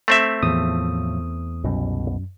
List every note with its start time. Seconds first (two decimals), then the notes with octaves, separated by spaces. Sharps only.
0.08 A3 C4 E5
0.43 E2 A2 F3 D#6
1.64 C2 F#2 B2